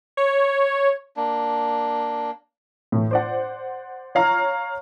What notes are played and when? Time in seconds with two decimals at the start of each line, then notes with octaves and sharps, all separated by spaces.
0.17 C#5
1.17 A#3 D4
2.92 A2 E3
3.11 C5 D5 F#5
4.15 C#5 F5 A#5 F6